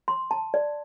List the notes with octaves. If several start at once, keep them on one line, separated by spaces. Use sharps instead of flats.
C6
A5
D5